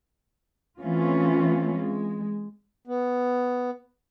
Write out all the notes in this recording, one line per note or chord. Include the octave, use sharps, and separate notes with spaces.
E3 A3 C4 C#4 F4
G#3
B3